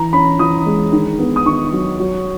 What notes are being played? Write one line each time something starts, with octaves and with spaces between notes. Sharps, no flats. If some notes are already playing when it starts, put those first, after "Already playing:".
Already playing: E3 A#5
C#4 B5
E3 D#6
G#3
D#3
B3
D#6
D#3 C#6
F#3
F#3